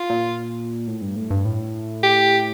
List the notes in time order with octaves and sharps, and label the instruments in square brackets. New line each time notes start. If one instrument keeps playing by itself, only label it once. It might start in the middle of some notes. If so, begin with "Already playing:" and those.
Already playing: [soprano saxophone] F4
[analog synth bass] A#2
A2
G2
A2
G2
A2
[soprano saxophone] G4